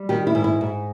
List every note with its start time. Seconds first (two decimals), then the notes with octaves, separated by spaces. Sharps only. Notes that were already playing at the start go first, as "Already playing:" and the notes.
Already playing: G3
0.09 D#3 G4
0.27 E4
0.35 G#2
0.44 E4
0.61 G#2